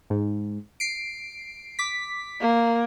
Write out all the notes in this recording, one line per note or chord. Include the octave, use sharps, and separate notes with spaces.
G#2
C7 D7
D6 B6
A#3